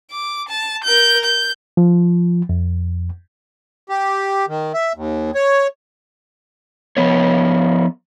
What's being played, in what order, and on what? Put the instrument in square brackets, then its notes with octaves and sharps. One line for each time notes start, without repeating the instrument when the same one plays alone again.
[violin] D6
A5
A#4 G6
G6
[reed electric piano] F3
F2
[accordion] G4
D#3
E5
D#2
C#5
[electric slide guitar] F3 B3 C#5